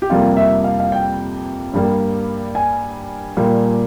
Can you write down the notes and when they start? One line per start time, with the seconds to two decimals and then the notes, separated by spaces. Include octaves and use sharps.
0.02 G4
0.10 F2 C3 G3 A#3 F4
0.37 E5
0.64 F5
0.80 F5
0.92 G5
1.73 G2 G3 A#3
2.55 G#5
3.37 A#2 G3 A#3